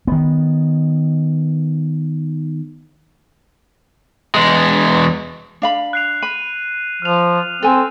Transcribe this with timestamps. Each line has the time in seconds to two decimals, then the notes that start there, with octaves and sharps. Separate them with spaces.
0.07 D#3 B3
4.35 E2 G#3
5.62 D4 F5 B5
5.93 F#6 C7 F7
6.22 B5 D#7
7.02 F3 F6 F7
7.62 C4 A4 G#5